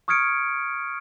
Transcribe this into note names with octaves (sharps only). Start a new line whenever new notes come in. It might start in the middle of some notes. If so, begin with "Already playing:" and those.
C#6 D#6 F6 G#6 C#7 D7